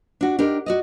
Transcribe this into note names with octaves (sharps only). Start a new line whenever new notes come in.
D4 F#4
D4 D#4 G4 A#4
F#4 D5 D#5